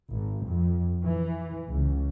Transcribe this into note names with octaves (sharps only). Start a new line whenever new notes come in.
G#1
F2
E3
C#2